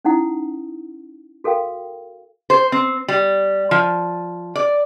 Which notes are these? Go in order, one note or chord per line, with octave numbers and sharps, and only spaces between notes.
C#4 D#4 E4 F#5 D#6
F#4 A4 A#4 F5 G5
C5
C4
G3
F3
D5